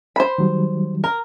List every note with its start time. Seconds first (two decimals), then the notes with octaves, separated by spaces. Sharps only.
0.16 C5 B5
0.38 D#3 F#3 G3
1.04 A#4